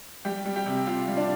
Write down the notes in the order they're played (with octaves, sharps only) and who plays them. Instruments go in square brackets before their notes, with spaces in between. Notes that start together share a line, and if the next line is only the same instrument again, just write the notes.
[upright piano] G3 G4 G5
G3
G4 G5
C3
C3 F4 F5
G3
D4 D5